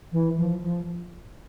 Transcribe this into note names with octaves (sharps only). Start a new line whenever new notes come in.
E3
F3
F3